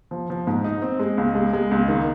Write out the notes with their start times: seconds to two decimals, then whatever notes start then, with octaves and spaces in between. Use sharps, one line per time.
0.11 F3
0.30 F3
0.47 G#2
0.64 D#4
0.82 C4
0.99 G#3
1.18 C#2
1.35 G#3
1.53 G#3
1.71 C#2
1.88 D#3